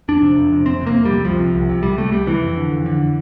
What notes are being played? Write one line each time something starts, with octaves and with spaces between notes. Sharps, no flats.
F2 D4
C3
F2
C3
F2 C4
C3 A#3
F2
G3
C3
C2 F3
C3
C2
C3
C2 G3
C3 A3
C2 G3
C3 E3
F2
D3
F2
D3